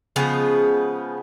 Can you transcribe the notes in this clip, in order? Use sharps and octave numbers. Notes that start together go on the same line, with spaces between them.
C#3 F3 G#3 B3